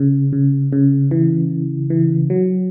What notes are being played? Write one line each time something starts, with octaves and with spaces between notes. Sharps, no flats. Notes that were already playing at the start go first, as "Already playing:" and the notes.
Already playing: C#3
C#3
C#3
E3
E3
F#3